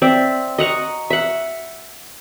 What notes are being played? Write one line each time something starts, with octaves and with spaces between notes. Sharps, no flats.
C4 D5 E5
D#5 F#5 A#5 C#6
E5 F#5